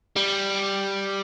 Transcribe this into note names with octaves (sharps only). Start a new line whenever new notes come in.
G3